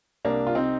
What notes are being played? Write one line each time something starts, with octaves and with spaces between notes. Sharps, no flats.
C2 A#3 D4
F4
C4 D#4